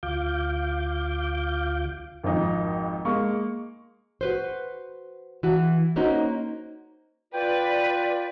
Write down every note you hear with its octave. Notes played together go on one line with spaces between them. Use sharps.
D2 F4 F5 D6 G6
G#1 F2 D#4
G#3 A#3 C#6
F#4 B4 C5
E3 F#4
A#3 C#4 D#4 F#4 C5
F4 B4 D5 G5